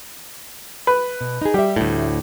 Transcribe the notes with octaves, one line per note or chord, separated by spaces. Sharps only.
B4
B2
D#4 G#4
G3 G4 E5
D2 A2